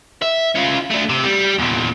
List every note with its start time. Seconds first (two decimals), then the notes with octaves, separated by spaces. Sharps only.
0.22 E5
0.55 C#4 F4
0.90 A3 D4
1.09 C3
1.24 G3
1.58 E2 A#2